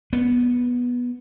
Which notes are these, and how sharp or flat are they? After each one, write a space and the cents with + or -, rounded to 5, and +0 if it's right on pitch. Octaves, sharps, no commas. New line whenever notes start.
B3 -10